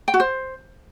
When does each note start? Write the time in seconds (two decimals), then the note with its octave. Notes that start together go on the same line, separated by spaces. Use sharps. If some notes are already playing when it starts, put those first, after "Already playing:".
0.08 G5
0.14 F#4
0.20 C5